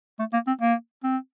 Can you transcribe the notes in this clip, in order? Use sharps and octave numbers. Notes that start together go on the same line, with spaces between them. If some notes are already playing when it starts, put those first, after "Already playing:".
A3
A#3
C4
A#3
C4